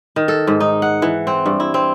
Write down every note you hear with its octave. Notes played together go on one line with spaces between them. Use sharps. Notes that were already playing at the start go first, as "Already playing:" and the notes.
D#3
A4
G#2
D#4
F#5
E3
C4
G2
E4
C4